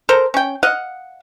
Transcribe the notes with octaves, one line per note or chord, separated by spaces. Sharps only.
A4 A#4 C5 A#5
C#4 G5
D#5 F5 F#5